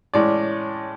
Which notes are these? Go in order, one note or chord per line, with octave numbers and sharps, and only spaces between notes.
A2 E3 G#3 C#4 D5